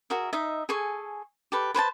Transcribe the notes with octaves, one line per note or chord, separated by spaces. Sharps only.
F#4 G#4 A#4 E5
D#4 D#5 E5
G#4 A4 G#5 C#6
G4 A4 B4
B4 C5 G#5 A5